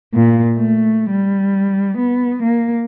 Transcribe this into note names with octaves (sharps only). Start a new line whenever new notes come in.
A#2
A3
G3
B3
A#3